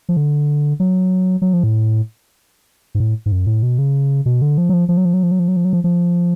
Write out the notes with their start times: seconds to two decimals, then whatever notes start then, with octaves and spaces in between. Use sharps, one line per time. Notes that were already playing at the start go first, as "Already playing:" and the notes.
0.09 F3
0.17 D3
0.80 F#3
1.42 F#3
1.53 F3
1.64 A2
2.95 G#2
3.00 A2
3.26 G#2
3.32 F#2
3.47 A2
3.63 B2
3.78 C#3
4.26 B2
4.42 D3
4.58 F3
4.69 F#3
4.73 F3
4.89 F3
4.97 F#3
5.05 F3
5.14 F#3
5.23 F3
5.31 F#3
5.39 F3
5.48 F#3
5.56 F3
5.65 F#3
5.73 F3
5.84 F3